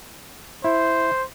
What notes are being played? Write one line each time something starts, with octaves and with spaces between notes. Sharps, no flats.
E4 C5